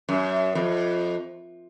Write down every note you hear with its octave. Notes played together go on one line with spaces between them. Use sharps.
F#2
F2